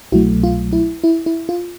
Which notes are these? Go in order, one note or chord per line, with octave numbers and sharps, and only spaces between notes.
C2 B2 F#3 A3 E4 F#4
F4
E4
E4
E4
F4